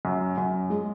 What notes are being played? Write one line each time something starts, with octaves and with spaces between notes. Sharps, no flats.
F#2
F#2
G#3